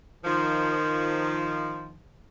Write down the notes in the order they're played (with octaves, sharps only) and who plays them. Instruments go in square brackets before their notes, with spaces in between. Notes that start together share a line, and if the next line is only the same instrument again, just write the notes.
[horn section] D#3 F3